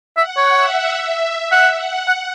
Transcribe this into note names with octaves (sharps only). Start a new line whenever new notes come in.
E5 F#5
C#5
E5
E5
F#5
F#5
F#5